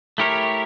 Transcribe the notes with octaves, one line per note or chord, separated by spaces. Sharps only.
A3 E4 G4 A#4 C#5